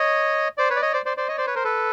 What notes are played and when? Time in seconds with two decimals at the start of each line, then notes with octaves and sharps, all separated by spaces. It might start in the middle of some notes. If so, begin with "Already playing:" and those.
Already playing: C#5 D#5
0.58 C5 D5
0.70 B4 C#5
0.76 D5
0.82 C#5 D#5
0.93 C5 D5
1.06 C5 D5
1.17 C5 D5
1.28 C#5 D#5
1.37 C5 D5
1.47 B4 C#5
1.55 A#4 C5
1.64 A4 B4